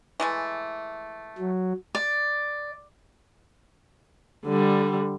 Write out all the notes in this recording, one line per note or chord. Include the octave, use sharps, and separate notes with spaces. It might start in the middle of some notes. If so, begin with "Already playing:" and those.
E3 G#3 A3
F#3
D5
D3 G3